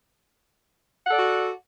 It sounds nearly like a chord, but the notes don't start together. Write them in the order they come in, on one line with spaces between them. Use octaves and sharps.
F#5 A4 D5 F#4